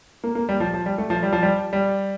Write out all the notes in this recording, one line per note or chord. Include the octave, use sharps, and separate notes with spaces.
A#3
A#3
G3
F3
F3
G3
A3
F3
G3
F3
G3
G3